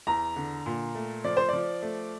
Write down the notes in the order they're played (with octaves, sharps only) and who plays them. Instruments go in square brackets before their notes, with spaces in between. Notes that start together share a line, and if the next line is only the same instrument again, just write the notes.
[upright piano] E2 A#5
D3
A#2
A3
F3 D5
C5
F3 D5
A3